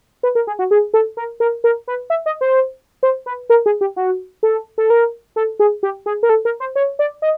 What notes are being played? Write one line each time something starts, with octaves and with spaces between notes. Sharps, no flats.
B4
A#4
G#4
F#4
G#4
A4
A#4
A#4
A#4
B4
E5
D#5
C5
C5
B4
A#4
G#4
G4
F#4
A4
A4
A#4
A4
G#4
G4
G#4
A#4
A4
A#4
C5
C#5
D5
D#5